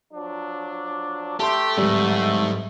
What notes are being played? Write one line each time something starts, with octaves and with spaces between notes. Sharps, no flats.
F3 F#3 D4
A3 G4 A5 C6
D1 G#2 G3